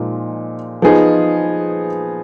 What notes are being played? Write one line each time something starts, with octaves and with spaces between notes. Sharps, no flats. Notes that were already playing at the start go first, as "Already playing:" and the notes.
Already playing: A#2 F3 G#3 D#4
F3 B3 D#4 G#4